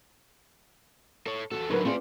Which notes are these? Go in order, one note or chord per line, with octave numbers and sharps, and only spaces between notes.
A4 C#5
E2 F#4 A4
D3 F#3 D#4 A#4 B4
A3 C4 F4 G#4 D5